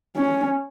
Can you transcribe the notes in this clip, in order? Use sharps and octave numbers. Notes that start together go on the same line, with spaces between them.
C#4